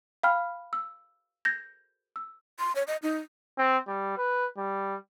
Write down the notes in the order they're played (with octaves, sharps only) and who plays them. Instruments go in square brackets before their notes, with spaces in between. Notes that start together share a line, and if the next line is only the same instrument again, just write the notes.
[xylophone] F5 G5 B5 F6
E6
G6 G#6 A#6
E6
[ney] C6
C#5
D#5
D#4
[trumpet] C4
G3
B4
G3